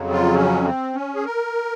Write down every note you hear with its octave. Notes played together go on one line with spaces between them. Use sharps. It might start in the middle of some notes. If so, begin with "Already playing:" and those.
Already playing: F2 C#3 F#3
F4
C#4
C4
C#4
G#4
A#4